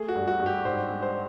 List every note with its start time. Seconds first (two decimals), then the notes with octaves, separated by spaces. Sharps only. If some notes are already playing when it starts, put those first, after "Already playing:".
Already playing: A3 G#4
0.08 F#4
0.15 G2
0.28 F#4
0.40 G2
0.46 G4
0.65 G#2 C5
0.90 G#3
1.02 C5